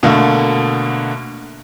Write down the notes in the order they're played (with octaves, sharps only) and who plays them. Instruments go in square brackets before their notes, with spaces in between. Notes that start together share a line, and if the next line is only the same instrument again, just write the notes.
[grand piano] B2 D3 A3 A#3